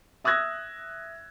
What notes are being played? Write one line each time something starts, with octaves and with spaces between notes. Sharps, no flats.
E5 D#6 E6 F#6 G#6 A#6